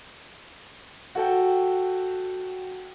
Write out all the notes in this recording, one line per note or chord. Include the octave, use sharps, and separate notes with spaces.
F#4 A4 G5